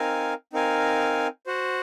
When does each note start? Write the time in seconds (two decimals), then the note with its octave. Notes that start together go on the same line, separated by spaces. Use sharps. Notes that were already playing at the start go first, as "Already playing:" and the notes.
Already playing: C4 D#4 A#4 F5 G#5
0.53 C4 D#4 A#4 F5 G#5
1.46 F#4 C5 F#5